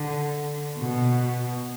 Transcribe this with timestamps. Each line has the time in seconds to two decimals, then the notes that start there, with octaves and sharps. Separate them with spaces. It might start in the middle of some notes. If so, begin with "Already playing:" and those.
Already playing: D3
0.78 B2